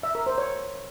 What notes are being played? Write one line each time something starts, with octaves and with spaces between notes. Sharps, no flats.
E5
A#4
C5
C#5